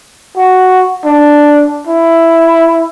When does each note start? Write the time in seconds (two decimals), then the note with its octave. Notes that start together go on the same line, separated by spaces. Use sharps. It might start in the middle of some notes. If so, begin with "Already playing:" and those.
0.37 F#4
1.05 D4
1.87 E4